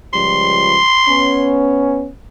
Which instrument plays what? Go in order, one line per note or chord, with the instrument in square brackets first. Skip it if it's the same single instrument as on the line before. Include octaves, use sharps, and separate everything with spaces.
[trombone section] C#2 F3 G3 [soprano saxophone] C6
[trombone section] B3 C#4